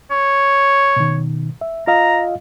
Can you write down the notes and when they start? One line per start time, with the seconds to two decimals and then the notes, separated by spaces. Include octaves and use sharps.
0.11 C#5
0.96 B2 D#3
1.61 E5
1.87 F4 D#5 F5 A#5